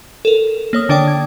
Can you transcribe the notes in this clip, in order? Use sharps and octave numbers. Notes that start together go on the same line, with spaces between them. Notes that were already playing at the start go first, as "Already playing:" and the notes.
A4 A#4
A#3 C#5 D#6
D3 D4 C#5 D5 G5 D6
G#6